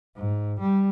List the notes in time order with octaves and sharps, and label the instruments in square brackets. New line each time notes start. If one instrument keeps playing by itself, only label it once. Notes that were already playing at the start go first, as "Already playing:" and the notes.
[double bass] G#2
G3